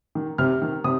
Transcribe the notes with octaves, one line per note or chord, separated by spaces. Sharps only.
D#3
C3 F6
D#3
C3 D#6